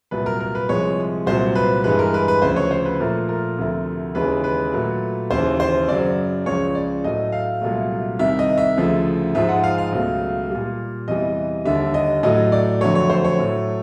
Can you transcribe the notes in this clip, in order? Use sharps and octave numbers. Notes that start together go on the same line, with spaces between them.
C2 A#2 F#3 B4
A#4
A#4
B4
C2 C3 F3 G#3 C#5
C2 A#2 F#3 C5
B4
G2 E3 G#3 B4
A#4
B4
B4
D2 C#3 F3 C5
C#5
C5
B4
A#2 F3 A3 A#4
A#4
D2 C3 F3 A3
D#2 C#3 E3 G#3 B4
B4
A#2 F#3 A3
D#2 C#3 E3 C5
C5
F#2 C#3 F#3 D5
C#2 C#3 F3 C#5
D5
A2 F#3 A3 D#5
F5
C2 A#2 F#3 A3
C2 C3 D#3 E5
D#5
E5
D2 C#3 F3 A3
G#2 F3 G#3 E5
F#5
F5
F5
C#2 B2 F#3 A3
A#2 G3
E2 C3 E3 G3 D#5
D#2 D3 G3 E5
D#5
A2 F#3 A3 D#5
D5
F2 D3 F#3 A3 C#5
C#5
C5
C#5
A2 F#3 A3